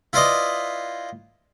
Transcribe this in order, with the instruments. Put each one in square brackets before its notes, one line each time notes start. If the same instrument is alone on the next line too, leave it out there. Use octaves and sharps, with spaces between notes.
[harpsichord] E4 F4 B4 C5 D5 D#5